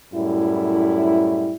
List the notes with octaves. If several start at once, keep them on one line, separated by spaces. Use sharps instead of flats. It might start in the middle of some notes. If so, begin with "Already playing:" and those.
F#2 A2 G3 E4